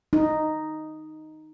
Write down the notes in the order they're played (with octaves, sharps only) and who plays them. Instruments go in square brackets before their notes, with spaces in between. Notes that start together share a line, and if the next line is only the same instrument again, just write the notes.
[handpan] D#4